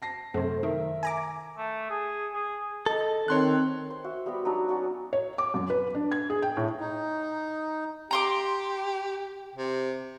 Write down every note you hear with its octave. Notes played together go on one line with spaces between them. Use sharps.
A5 A#6 C7
F#2 C3 A3 C5
D#3 A#4 E5
G#5 A#5 D6
A3
G#4
G#4
A4 D#5
D#3 C4 C#5 C6 F#6
C5
F#4 E5
G3 B3 F#4 G4
F#3 D4 D#4 F#4
C#4 D4 F#4 F#5
C#5
D6
F#2
B4
D4
G#6
G#4
G5
A2
D#4
G4 A#5 C6 D6
C3